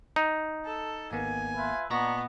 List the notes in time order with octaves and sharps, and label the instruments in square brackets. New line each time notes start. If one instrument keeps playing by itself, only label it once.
[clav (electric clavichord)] D#4
[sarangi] A4
[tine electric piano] G#1 A#3 B3 [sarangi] G#5
[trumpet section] F4 B4 E5
[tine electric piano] A#2 D#5 A#6 [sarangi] B3 [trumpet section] D4 A#5 C#6